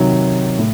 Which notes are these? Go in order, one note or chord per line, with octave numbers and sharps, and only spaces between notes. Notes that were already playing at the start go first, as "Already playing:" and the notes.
Already playing: C3 D#3 F#3
A2